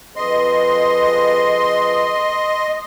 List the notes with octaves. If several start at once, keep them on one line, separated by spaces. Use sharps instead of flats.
F2 G#4 B4 D#5 C6